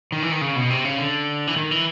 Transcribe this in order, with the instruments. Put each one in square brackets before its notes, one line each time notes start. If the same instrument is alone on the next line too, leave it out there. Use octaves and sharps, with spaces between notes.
[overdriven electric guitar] D#3
E3
D#3
C#3
B2
C3
C#3
D3
E3
D#3
E3